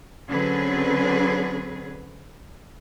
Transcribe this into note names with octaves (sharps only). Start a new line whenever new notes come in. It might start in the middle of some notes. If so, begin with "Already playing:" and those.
D3 F#3 C4 C#4 G#4 B4